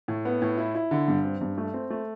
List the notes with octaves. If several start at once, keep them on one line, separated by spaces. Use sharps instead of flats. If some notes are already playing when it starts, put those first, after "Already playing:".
A2
B3
A2
E4
E4
D3
G2
C4
G2
A3
C4
A3